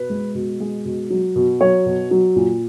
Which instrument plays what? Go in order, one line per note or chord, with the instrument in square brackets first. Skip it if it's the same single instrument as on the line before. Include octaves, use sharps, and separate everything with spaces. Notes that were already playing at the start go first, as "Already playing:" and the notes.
Already playing: [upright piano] B2 B4
G#3
B2
G#3
B2
F#3
B2
F#3 C#5
B2
F#3
A#2